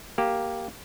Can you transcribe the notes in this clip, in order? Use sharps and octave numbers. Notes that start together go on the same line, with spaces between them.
A#3 G4